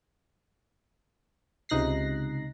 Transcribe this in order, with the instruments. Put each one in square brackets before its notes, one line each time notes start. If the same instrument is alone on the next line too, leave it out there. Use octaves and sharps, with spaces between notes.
[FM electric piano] C#2 C3 D#4 F#6 A#6 C7